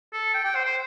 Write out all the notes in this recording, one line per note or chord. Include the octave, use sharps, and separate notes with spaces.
A4
G5
G5
C5
C5